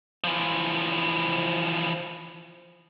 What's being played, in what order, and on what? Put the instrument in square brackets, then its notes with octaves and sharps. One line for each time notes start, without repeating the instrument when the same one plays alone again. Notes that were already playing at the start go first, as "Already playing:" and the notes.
[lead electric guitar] E3 F3